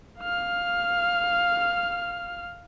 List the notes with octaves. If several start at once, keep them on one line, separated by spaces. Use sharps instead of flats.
F5 F6